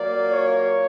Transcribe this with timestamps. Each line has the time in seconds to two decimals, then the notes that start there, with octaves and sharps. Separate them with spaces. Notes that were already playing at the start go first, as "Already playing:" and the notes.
Already playing: A#2 F#3 A#3 D5
0.31 C#5